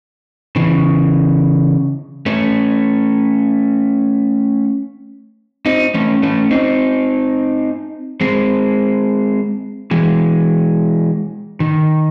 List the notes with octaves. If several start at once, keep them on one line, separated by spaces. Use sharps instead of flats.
C#3 E3
A3 C#4
C4 D#4
A3 C#4
A3 C#4
C4 D#4
G#3 C4
E3 G#3
D#3